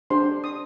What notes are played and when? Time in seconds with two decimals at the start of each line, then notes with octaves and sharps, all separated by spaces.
0.10 D4 G4 C5 C6
0.44 D#6